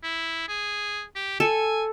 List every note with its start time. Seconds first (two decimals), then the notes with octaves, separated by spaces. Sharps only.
0.03 E4
0.48 G#4
1.15 G4
1.40 A4 G#5